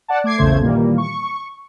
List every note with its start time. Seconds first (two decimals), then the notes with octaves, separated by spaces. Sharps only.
0.08 D5 F#5 A5
0.24 A3 D6 G#6 C7
0.38 A#1 E2 C#3 A3 C5 G#6
0.61 A#2 D#3 E3 G3 A#3
0.98 C#6